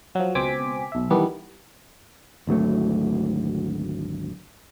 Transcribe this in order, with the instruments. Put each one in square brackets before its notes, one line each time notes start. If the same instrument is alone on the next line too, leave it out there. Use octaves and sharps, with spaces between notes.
[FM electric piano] F3 F#3
C#2 B2 C4 G#5 D6 B6
B1 E5
D#3 E3 G3 B3 D4
[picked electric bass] G#1 D2 F#3 A3